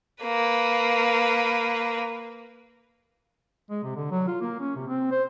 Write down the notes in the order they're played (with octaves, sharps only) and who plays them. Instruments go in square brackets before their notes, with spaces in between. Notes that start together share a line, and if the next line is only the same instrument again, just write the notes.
[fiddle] A#3 B4
[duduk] G#3
C3
D3
F#3
F4
A#3
C#4
C3
C4
C5